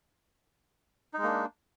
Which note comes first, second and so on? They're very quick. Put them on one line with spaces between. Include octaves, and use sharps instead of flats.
D#4 G#3 A#3 D4